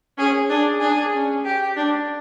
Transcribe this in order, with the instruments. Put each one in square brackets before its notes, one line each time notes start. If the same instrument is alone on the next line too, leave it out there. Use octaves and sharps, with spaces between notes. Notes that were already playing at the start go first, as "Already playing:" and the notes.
[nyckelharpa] C#4 [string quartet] G#4
[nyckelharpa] D4 [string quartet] G#4
[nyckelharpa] D4 [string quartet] G#4
[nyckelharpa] C#4
[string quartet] G4
[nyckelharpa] D4